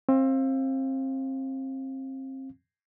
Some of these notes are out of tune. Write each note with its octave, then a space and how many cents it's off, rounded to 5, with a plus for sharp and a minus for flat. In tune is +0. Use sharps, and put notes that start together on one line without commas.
C4 +25 F5 +0